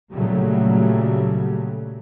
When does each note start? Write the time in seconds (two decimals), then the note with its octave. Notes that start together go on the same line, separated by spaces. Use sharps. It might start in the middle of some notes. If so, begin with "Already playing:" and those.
0.13 A#2 C#3 F#3 G3 A3